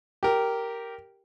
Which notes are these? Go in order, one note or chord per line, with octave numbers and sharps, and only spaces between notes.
G4 A#4